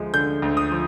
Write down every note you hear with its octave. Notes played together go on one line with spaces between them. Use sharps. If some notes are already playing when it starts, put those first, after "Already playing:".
Already playing: D2 F3 G#3
D3 G6
D2
D#6
F3